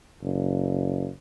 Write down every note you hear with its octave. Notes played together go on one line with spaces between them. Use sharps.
F#1